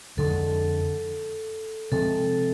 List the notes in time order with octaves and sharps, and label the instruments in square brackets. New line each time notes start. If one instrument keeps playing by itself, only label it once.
[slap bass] F2 D3 F3 G#3 [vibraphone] A4
[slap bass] C3 F3 G#3 [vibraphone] A4